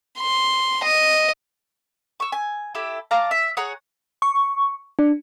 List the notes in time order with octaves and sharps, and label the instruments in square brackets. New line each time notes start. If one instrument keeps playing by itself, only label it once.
[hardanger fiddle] C6
D#5
[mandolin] C#6 E6
G#5
E4 G4 A4
D5 F5 A5 A#5
E5
G#4 C#5 F#5 A#5
[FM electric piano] C#6
D4